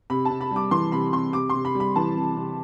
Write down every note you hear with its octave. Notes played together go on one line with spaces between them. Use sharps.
C3 B5
C3 A5
B5
G3 D6
E3 C6
C3 B5
C3 C6
C3 D6
C3 C6
B5
G3
B5
E3 A5
C3
C3